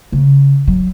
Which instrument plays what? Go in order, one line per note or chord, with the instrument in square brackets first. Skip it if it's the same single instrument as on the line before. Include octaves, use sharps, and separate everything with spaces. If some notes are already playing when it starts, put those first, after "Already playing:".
[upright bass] C#3
F#3